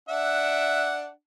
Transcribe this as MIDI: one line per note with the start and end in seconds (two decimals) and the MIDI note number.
0.09 1.10 62
0.09 1.10 76
0.09 1.10 78